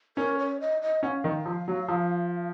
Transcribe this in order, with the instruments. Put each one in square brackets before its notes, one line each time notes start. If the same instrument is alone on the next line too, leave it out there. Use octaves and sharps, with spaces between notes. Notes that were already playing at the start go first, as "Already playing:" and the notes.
[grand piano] C#4 [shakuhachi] A#4
[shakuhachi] C#5
D#5
D#5
[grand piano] C#4 [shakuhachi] F#5
[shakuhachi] F5
[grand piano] D#3
F3
F#3
F3